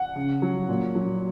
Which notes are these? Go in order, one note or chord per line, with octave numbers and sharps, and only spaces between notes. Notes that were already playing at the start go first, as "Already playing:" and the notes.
Already playing: F#5
C#3
F#3
A#2
F#3